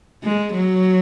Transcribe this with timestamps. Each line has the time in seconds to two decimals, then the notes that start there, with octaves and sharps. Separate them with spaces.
0.24 G#3
0.53 F#3